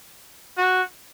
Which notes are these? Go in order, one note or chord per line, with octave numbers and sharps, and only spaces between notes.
F#4